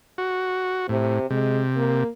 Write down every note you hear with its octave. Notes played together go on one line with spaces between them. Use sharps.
F#4
A2 C3
C3 G#3
A#3